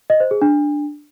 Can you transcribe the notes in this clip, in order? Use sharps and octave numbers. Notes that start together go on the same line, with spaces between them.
D#5
C5
G#4
D4